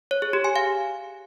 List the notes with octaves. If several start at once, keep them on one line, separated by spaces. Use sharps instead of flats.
C#5
G#4
G4
G#5
F5